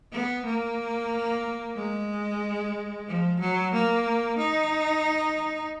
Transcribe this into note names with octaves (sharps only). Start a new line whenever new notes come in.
B3
A#3
G#3
F3
F#3
A#3
D#4